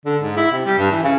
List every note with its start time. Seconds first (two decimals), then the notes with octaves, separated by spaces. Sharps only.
0.06 D3
0.22 G#2
0.37 E4
0.52 C3
0.66 G3
0.78 G2
0.91 E3
1.03 C#3